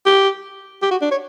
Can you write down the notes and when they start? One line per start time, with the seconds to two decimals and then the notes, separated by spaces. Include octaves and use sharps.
0.06 G4
0.82 G4
0.91 F#4
1.02 D4
1.11 C#5